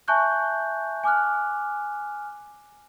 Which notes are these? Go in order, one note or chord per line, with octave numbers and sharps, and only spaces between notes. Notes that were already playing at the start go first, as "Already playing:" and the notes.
E5 G#5 A5 C#6 F#6 G6
G#5 D6 F6 F#6